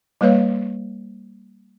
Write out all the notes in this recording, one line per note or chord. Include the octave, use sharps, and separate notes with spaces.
G3 A#3 B4 C#5 F5